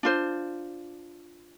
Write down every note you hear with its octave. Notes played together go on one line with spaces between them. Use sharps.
D4 F4 C5